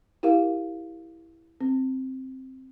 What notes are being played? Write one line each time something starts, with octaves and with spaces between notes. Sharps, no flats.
E4 G4 A#4 F5
C4